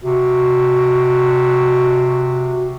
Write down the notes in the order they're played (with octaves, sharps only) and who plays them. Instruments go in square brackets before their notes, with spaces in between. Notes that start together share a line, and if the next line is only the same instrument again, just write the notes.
[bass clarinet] C3 [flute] F#4